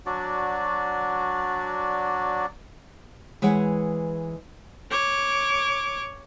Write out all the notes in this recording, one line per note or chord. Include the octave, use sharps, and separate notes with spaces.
F#3 D4 F#4 D5
E3 G#3 B4 C#5 F#5
C#5 D6